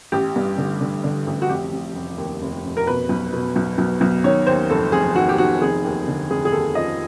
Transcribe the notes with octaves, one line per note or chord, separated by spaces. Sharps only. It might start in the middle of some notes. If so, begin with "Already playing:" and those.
A1 G4
G2
D3
D3
D3
A1
F#4
F1 G4
F1
F1
D#2
F1
F1
A#4
B2 B4
B1
B2
B1
B1
B1
D#3 C#5
D#2 C5
F1 A4
F1 G#4
D#3 F#4
G4
D#3 F#4
F1 G#4
D#2
D3
F1 G#4
G#4
D#2 A4
F3 D#5